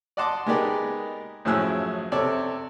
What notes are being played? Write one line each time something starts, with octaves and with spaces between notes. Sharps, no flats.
D5 D#5 F#5 A5 C6 D6
G#3 B3 D#4 G4 A#4 D5
F#2 A2 F3 G#4 E6 F#6
C3 A4 C#5 D5